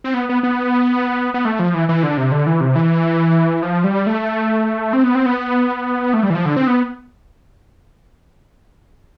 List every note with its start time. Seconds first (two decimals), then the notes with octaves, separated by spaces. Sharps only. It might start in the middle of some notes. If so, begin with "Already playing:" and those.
0.04 C4
0.14 B3
0.29 B3
0.43 B3
1.34 B3
1.45 A3
1.59 F3
1.74 E3
1.89 E3
2.03 D3
2.17 C3
2.32 D3
2.47 E3
2.61 C3
2.76 E3
3.62 F3
3.84 G3
4.07 A3
4.93 C4
5.04 B3
5.15 C4
5.26 B3
6.14 A3
6.23 G3
6.30 E3
6.35 F3
6.45 D3
6.57 C4
6.67 B3